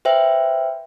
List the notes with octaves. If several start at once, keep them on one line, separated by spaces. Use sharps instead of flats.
B4 C5 E5 G5